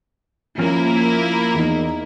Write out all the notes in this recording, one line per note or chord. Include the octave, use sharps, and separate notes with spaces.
F3 A#3 C#4 E4 A#4 F6
E2 D#4